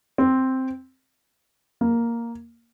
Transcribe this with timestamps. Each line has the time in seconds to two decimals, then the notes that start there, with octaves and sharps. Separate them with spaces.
0.18 C4
1.81 A#3